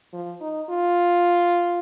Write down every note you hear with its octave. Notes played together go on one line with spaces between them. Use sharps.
F3
D#4
F4